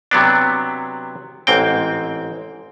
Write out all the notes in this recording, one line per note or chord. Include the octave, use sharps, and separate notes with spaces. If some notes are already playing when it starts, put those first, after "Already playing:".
C3 F#3 B3 D4
A1 G#2 C4 G5